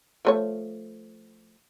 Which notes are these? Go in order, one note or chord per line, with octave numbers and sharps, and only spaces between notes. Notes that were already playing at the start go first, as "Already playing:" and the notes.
F3 A3 C#5